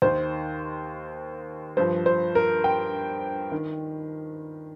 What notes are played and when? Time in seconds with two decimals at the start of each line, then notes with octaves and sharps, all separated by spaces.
0.02 D#2 D#3 C5
1.77 G2 F3 C5
2.06 C5
2.35 A#4
2.64 G5
3.52 D#3